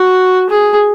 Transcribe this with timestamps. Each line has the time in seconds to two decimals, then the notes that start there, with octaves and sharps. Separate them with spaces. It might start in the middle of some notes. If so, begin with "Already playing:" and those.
Already playing: F#4
0.49 G#4